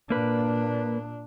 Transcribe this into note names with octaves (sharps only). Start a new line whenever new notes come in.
A#2 A#3 D4 B4